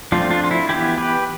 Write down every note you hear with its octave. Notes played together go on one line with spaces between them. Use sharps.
F3 A3 C4 D4 F4
D4 F4
F4
E4
E3 B3 E4 G4
G4 B4